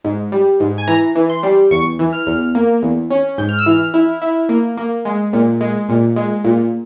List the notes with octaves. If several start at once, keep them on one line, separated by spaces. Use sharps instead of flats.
G#2
G3
G#2
G#5
E3 A#5
E3
C6
G3
E2 C#6
E3
F6
E2
A#3
E2
C#4
G#2 G6
F6
E6
E3 F6
E4
E4
A#3
A#3
G#3
A#2
G#3
A#2
G#3
A#2